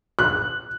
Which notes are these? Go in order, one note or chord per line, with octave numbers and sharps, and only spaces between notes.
F#6